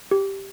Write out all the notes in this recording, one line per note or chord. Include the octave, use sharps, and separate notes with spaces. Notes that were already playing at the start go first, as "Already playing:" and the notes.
G4